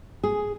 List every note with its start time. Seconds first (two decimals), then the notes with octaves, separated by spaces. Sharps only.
0.24 G#4